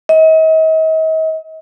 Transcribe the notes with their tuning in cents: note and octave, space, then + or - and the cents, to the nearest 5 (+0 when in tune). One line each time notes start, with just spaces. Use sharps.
D#5 +40